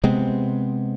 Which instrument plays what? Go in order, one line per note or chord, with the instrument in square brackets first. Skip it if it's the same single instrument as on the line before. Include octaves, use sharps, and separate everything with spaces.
[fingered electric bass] C3 G#3 B3 C4